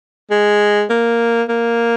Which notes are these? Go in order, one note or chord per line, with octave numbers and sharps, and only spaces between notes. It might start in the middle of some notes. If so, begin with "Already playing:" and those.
G#3
A#3
A#3